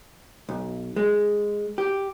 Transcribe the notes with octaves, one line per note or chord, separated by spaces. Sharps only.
B1
G#3
G4